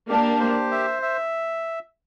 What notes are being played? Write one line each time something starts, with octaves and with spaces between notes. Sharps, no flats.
A#3 D4 G4
C5
E5
E5